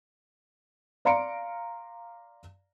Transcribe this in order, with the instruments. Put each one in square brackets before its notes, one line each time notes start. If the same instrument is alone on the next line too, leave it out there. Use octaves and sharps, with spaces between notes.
[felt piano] D5 F5 A#5 C6 C#7 D7